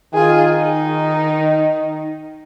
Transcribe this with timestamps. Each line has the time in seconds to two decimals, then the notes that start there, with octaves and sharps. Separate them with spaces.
0.14 D#3 F4 G#4
0.54 D#4